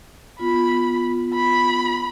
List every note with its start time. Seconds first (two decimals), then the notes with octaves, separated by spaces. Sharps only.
0.39 B3 F4 B5
1.35 B5